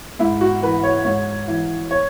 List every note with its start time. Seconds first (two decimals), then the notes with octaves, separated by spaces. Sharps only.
0.19 G#2 E4
0.41 F#4
0.62 E3 B4
0.83 C#5
1.05 G#2 C#5
1.48 E3
1.91 C#5